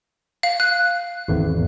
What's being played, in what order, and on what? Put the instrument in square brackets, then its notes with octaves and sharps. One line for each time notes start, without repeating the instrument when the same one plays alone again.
[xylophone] F5
F#6
[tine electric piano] G#1 E2